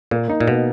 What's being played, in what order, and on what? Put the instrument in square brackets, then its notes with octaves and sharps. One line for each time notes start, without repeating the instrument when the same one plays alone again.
[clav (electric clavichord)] A#2 [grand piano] A#3
[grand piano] D#4
[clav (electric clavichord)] A#2
[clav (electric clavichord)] B2 [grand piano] A#3